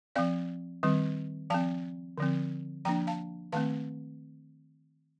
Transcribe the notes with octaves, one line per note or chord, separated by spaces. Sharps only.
F3 C4 D5 F5
D#3 G3 C4
F3 C4 F5 A5
D3 F3 C4
F3 A#3 D4 G5 A#5
F5 A5
D#3 A3 C4 F5 A5